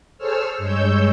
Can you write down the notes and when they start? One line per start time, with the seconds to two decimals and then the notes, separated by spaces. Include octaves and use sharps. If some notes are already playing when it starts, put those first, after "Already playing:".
0.18 G#4 A4 C5 C#5 E6 F6
0.58 G2 G#3 C#5 E6 G6